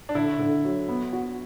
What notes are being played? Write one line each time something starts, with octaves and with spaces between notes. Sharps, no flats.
D4
D3 E4
D3
F#3
B3
F#4